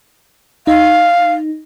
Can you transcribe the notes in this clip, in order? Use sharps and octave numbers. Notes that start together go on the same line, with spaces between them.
D#4 F5